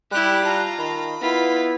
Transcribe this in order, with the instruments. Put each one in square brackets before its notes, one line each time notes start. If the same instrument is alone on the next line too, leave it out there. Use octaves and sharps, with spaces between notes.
[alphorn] G3 [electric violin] E4 G4 [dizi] F#6
[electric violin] F4 A#5 [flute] A5
[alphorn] D#3 [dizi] B5
[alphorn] B3 [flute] E4 [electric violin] F4 B6